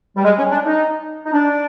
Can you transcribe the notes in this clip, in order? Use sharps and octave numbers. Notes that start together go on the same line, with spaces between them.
G3
G#3
C#4
D4
D#4
D#4
D4